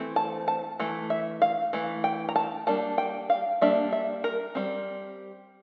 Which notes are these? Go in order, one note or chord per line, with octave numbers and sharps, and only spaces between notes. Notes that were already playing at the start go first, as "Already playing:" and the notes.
Already playing: E3 A3 C4
A5
A5
E3 A3
E5
F5
E3 A3
G5
A#5
A5
G3 A#3 D4 A5
G5
F5
G3 A#3 D4 E5
E5
A#4
G3 C4